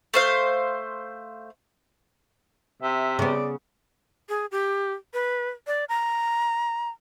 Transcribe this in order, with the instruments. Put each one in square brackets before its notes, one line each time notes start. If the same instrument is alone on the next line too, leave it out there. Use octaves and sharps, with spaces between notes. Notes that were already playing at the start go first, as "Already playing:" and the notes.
[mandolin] A3 C5 F5
[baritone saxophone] C3 [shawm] E5
[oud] C#3 B3 [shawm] D5
[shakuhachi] G#4
G4
B4
D5
A#5